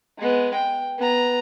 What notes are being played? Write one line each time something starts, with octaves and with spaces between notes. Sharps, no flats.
G#3 B3
G5
B3 A#5